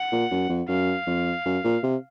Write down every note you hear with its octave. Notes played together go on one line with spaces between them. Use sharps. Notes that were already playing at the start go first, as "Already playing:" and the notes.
Already playing: F#5
A#2
F#2
F2
F#2 F5
F2
F#2
A#2
C3